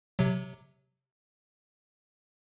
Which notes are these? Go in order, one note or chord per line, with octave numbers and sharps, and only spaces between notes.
C3 F#3